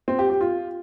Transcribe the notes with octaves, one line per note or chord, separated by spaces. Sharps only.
C4
G4
G4
F4